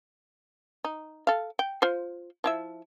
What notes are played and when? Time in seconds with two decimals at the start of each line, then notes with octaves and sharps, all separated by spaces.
0.84 D#4
1.27 A4 F5
1.59 G5
1.82 F4 C5
2.44 F3 E4 E5